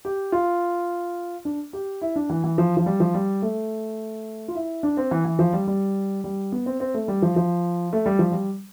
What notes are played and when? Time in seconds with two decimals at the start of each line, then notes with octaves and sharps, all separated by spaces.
0.05 G4
0.32 F4
1.45 D4
1.73 G4
2.02 E4
2.16 D4
2.30 E3
2.44 E3
2.58 F3
2.77 F3
2.86 G3
3.00 F3
3.14 G3
3.42 A3
4.48 F4
4.55 E4
4.83 D4
4.97 C4
5.11 E3
5.25 E3
5.39 F3
5.53 G3
5.67 G3
6.24 G3
6.52 B3
6.66 C4
6.80 C4
6.94 A3
7.08 G3
7.22 F3
7.36 F3
7.93 A3
8.06 G3
8.19 F3
8.32 G3